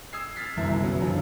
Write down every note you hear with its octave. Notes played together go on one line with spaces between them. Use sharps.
D#6 E6 G#6 C7
F6 A6 B6 C7
G1 C2 F#2 E4
C#3 F#3 B3
F#2 D3 F3 F#3 F4